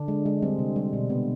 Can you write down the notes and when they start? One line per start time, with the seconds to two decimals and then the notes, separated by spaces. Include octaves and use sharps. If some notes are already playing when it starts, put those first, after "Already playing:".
Already playing: D3 D4
0.08 G#3
0.26 G#3
0.42 G3 C4
0.59 C3
0.76 G3
0.93 B2
1.10 C3 B3